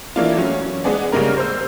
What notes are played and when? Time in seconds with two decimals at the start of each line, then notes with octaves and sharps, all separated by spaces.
0.16 E3 A3 A#3 D4 F4
0.37 F#3 C#4
0.58 C#4
0.84 G#3 B3 G#4 D5
1.12 C#3 G3 G#3 A#3 A#4
1.37 C5 E6